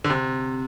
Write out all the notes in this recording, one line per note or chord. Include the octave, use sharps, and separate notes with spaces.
D3
C3